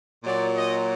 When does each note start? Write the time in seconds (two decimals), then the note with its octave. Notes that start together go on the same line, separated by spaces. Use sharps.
0.24 A#2 F#3 D5
0.54 D#5